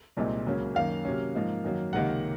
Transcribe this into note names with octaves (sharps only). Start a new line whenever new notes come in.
C2 A#2 G#3 C4 D#4
C#2 C#3 F#3 A#3 C#4
F#2 D#3 A#3 C#4 F5
C3 F#3 A#3 C#4
G#2 F3 A#3 D#4
F#2 D#3 F#3 A#3
C#2 C3 D#3 A#3 D#4 F#5